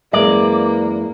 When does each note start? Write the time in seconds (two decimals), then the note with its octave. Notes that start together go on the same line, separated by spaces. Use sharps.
0.13 F#2 E3 G#3 A#3 D5